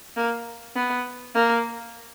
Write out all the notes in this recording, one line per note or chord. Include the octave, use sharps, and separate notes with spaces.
A#3
B3
A#3